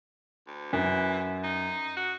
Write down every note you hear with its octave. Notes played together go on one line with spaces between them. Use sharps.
D2
F#2 E3
D#4
F#4